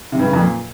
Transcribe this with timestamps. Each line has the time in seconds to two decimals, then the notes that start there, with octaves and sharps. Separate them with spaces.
0.12 C3
0.19 G2
0.26 C#3
0.33 F2
0.40 A#2